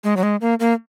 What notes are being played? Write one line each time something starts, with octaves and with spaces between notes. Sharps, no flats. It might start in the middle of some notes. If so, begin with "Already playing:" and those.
G#3
F#3
G#3
A#3
A#3